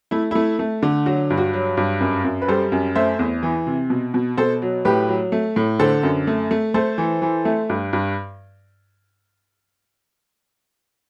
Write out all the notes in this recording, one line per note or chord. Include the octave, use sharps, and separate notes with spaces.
A3 E4
A3 E4
A3
D3
F#3 F#4
G2
F#4
F#3
G2
F#2
F#2
B4
G3 A4 C5
F#2
A3 C5 E5
E2
E3
C3
B2
B2
B2 A4 C5
F#3
A2 G4 B4
F#3
A3
A2
D3 A4 C5
F#2
A3
A3
A3 A4 C5
E3
E3
A3
G2
G2